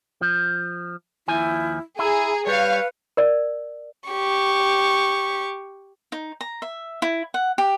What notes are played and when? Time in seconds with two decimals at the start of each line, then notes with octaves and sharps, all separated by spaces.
0.21 F3
1.28 D#2 F3 E4 G#5
1.99 E4 G#4 A#5
2.47 G3 B4 C#5 F5
3.17 A#4 D5
4.09 G4 C#6
6.12 D#4
6.41 A#5
6.62 E5
7.02 E4
7.34 F#5
7.58 G4